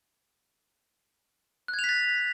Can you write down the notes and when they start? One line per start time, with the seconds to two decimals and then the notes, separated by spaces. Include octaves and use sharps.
1.68 F#6
1.74 G#6
1.79 F7
1.84 B6
1.89 A6